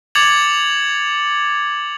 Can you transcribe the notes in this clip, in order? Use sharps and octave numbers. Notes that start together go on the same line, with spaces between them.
D6 G#6 A6 C#7 F7 F#7